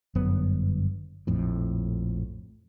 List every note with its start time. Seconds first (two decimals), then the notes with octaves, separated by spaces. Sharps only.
0.15 G1 F#2 F#3 B3
1.27 A#1 F2 A2